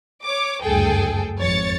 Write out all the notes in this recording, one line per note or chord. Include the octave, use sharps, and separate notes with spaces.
C#5 D6
F#1 D2 G2 G#4 A4 G5
G#1 F2 C#5 A6 C#7